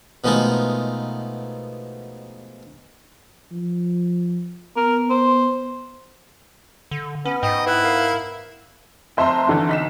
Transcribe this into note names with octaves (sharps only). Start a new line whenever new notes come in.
B2 F3 G#3 A3 D#4 A#4
F3
B3 A#4
C5
D3
B3 C#4
G#2 D#5 G5
E4 B4 F#6
A#4 F5
F1 C5 E5 A5 A#5 C6
G1 D3 E3
B1 B6 E7